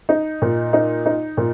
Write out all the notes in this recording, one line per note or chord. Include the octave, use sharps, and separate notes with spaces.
D#4
A#2
D#4
D#4
A#2